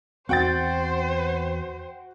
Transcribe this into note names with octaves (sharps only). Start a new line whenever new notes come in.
E2 C4 F#4 C5 G5 A6